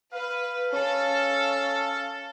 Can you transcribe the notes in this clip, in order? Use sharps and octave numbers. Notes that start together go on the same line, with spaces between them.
B4 F5
C#4 A4